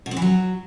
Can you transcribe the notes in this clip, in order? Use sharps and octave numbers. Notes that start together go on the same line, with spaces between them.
B2
C4
E3
F#3